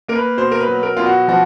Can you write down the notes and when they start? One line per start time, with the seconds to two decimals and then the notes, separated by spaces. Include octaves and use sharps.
0.08 A#3 A#4
0.15 B4
0.37 B2 C5
0.52 A#4
0.60 B4
0.68 F#3
0.83 A#4
0.97 B2 F4
1.06 F#4
1.28 F3 F#4